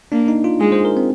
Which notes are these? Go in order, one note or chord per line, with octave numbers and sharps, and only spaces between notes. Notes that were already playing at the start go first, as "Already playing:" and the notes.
A#3 D4
D#4
F4
G#3 G#4
C5
A#4
C4